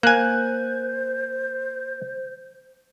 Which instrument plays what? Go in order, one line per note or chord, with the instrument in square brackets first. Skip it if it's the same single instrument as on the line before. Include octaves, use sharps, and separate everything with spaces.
[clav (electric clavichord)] A#3 G#5 [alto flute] C5 [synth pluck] F#6